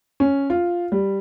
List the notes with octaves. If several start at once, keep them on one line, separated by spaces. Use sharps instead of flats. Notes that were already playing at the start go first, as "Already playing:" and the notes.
C#4
F4
G3